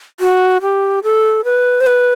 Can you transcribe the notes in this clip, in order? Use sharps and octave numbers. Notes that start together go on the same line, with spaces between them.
F#4
G4
A4
B4
C5
B4